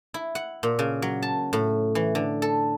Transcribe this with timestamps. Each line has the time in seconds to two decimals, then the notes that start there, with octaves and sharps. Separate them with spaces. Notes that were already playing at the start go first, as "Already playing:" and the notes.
0.14 E4
0.35 F#5
0.63 A#2
0.79 C#3
1.02 F#3
1.22 A5
1.53 A2
1.95 E3
2.15 D3
2.42 A4